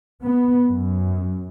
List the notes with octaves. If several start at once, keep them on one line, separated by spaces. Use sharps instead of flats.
B3
F#2